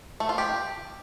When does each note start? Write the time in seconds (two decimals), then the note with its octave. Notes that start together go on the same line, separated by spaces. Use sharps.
0.20 A3
0.29 F4
0.38 G4